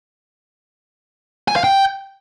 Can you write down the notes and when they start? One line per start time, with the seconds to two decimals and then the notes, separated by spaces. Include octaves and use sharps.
1.48 G#5
1.56 F5
1.64 G5